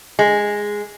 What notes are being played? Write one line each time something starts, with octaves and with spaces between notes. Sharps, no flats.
G#3